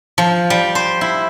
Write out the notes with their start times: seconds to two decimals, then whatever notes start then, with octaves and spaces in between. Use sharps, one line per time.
0.18 F3
0.50 G3
0.75 C5
1.01 E4